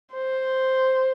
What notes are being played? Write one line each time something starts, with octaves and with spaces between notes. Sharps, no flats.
C5